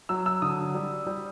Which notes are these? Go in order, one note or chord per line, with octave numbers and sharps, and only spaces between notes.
F#3 E6
E6
D3 D#6
G3
G3